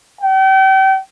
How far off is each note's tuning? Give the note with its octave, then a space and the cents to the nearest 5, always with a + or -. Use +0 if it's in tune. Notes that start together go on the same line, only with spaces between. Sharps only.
G5 -35